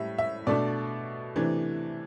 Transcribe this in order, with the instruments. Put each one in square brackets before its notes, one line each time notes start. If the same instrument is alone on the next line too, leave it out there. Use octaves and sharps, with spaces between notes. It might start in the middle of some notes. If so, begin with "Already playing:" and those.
Already playing: [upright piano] A2 G3 E5
E5
B2 A3 D4 D5
C3 E3 A3 D4